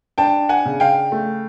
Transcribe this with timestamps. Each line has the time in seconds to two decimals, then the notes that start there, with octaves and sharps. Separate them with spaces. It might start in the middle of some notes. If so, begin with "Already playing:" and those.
0.18 D4 G5 A5
0.49 F#5 G#5
0.65 C#3
0.80 F5 G5
1.12 A3